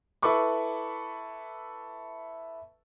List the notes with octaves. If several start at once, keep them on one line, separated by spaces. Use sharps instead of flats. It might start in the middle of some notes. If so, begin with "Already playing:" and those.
E4 A4 B4 B5 C#6 D6